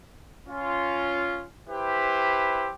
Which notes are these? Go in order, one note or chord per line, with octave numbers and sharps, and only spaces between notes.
C#4 F4
E4 G4 B4 C5